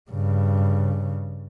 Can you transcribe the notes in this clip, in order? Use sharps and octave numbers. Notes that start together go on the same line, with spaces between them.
G2 C#3